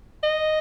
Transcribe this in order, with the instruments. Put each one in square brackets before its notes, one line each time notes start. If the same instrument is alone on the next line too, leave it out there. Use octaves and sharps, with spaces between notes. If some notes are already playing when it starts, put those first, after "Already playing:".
[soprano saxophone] D#5